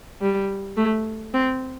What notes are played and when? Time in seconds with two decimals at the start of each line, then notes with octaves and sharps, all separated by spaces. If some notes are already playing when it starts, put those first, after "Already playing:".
0.22 G3
0.77 A3
1.34 C4